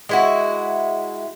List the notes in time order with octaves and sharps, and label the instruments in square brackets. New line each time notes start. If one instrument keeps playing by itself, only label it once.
[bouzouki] G#3 E4 F#4